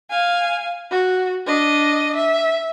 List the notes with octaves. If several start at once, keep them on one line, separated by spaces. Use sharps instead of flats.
F5 G#5
F#4
D4 D#5
E5